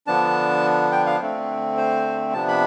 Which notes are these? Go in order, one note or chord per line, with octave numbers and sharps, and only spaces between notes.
D3 F3 B3 D4 A5
G5
F5
D3 A3 C4
C5
C3 F3 B3 D4 A5
B5